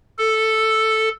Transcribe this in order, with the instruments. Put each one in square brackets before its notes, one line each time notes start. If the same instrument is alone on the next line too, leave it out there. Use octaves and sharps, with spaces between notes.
[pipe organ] A4